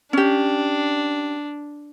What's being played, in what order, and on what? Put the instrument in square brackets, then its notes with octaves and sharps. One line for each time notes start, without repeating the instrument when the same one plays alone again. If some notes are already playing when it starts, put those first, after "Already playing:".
[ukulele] C#4 G4 [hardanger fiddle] D4